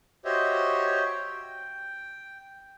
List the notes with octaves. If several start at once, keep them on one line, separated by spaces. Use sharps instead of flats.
F#4 G4 C5 C#5 D#5 E5
G5